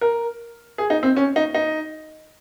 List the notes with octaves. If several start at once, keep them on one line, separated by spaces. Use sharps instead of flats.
A#4
G#4
D#4
C4
C#4
D#4
D#4